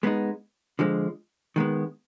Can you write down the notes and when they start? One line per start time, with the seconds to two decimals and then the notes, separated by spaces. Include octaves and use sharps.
0.03 G#3 B3 D#4
0.79 D3 F3 G#3
1.56 D#3 G#3 B3